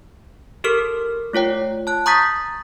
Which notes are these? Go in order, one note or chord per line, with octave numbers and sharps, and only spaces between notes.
G4 A4 A#4 C#6 F6
A3 F4 C#5 G5
A5 F#6
A#5 C#6 D#6 G6 A6 B6